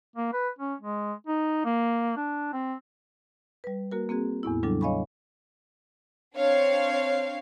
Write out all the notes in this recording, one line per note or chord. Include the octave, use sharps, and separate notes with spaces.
A#3
B4
C#4
G#3
D#4
A#3
D4
C4
G3 B4
A#3 F#4 A#4
A#3 C4 F#4 G#4
E2 A2 B3 E4
C#3 F#3 G3 D4 A4
C#5 D#5 F5 G#5 B5 C#6
C4 D4 C#5 F5